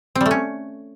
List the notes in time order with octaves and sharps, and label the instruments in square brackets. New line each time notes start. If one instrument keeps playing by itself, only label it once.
[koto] C4
G3
A3
C#4